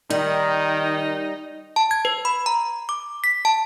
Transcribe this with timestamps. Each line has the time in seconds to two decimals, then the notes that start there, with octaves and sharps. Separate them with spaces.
0.10 D#3 G3 D#4
1.76 A5
1.91 G#6
2.05 B4
2.25 B5
2.46 A#5
2.89 D6
3.24 B6
3.45 A5